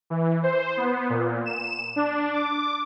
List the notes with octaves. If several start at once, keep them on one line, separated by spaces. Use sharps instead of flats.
E3
C5
B3
A#2
E7
D4
D6